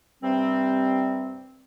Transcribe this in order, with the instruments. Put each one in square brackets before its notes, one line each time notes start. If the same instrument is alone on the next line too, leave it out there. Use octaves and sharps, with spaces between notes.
[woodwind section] G2 C3 G3 C4